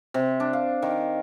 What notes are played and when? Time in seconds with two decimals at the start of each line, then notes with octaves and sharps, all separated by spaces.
0.14 C3
0.40 D4
0.53 F5
0.82 D#3